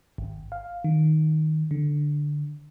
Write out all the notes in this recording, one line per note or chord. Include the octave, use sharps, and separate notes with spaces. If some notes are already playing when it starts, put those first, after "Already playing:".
G#1
F5
D#3
D3